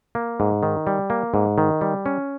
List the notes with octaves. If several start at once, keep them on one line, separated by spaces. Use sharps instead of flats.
A#3
G#2
D#3
G3
A#3
G#2
D#3
G3
C#4